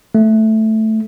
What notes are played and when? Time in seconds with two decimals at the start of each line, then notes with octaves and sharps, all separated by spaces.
0.15 A3